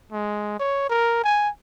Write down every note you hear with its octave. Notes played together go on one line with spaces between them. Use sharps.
G#3
C#5
A#4
G#5